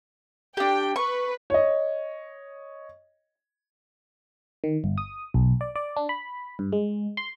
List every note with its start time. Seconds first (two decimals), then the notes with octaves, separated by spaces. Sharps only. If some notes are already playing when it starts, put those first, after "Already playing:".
0.57 D4 G4 G5
0.96 B4 C#6
1.50 C#5 D#5
4.64 D#3
4.84 G1
4.98 D#6
5.34 B1
5.61 D5
5.76 D5
5.97 D4
6.09 B5
6.59 G2
6.72 G#3
7.17 C6